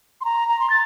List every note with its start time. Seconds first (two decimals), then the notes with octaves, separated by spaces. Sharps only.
0.21 C6
0.25 A#5
0.49 A#5
0.60 C6
0.70 A6